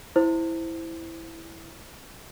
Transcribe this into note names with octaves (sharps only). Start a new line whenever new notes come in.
E4 C5